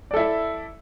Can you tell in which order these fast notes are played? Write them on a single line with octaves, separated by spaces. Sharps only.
D5 A4 E4 E5